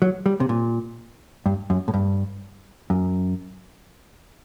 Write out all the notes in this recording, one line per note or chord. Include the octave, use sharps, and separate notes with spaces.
F#3
G3
C3
A#2
G2
F#2
A2
G2
F#2